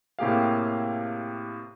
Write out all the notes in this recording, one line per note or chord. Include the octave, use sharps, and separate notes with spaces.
A2 C3 A#3 G4 G#4 F5